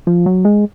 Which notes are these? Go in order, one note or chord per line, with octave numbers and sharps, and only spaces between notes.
F3
F#3
G#3